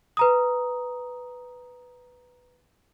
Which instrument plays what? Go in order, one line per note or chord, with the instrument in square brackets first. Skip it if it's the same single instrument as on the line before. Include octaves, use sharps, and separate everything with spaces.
[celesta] B4 A#5 D#6